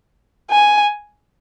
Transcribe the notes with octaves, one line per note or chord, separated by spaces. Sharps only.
G#5